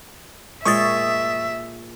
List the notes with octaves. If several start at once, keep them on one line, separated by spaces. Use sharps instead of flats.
A#2 G#3 C#5 E5 C#6 D#6 A6